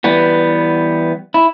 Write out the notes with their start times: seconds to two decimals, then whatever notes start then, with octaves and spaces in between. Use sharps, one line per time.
0.04 E3 G3 B3
1.34 E4